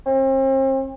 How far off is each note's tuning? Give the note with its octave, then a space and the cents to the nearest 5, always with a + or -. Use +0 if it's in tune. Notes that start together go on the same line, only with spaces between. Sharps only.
C4 +40